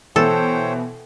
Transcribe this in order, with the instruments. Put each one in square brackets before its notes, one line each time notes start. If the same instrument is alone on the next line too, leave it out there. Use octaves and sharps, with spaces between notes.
[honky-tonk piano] B2 E3 [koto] A4 [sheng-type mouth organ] C5 C#5 G5